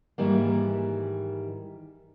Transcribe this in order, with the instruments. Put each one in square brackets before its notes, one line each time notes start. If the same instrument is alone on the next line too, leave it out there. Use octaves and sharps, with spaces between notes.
[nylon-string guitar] G#2 D#3 E3 G3 A#3